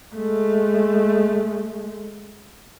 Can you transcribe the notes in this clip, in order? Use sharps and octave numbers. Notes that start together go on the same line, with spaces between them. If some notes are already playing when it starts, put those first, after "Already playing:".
G#3 A3